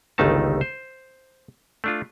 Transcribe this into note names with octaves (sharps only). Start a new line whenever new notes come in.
G1 C#2 D#3 A3 D#4 A5
C5
A3 D4 F4